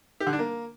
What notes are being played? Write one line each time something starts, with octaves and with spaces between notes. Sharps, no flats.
G4
D3
D4
A#3